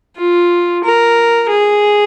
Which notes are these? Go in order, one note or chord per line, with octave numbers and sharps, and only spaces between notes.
F4
A#4
G#4